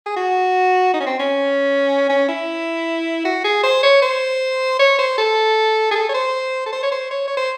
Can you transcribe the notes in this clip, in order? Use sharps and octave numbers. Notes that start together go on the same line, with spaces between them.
G#4
F#4
D#4
C#4
C4
C#4
C#4
E4
F#4
G#4
C5
C#5
C5
C#5
C5
A4
G#4
A4
C#5
C5
A4
C5
C#5
C5
C#5
C#5
C5